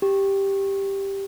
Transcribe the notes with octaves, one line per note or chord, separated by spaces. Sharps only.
G4